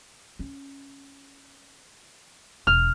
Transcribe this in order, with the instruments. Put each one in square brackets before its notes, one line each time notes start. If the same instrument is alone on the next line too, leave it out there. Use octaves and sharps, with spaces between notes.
[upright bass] C#4
[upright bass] E1 [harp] F6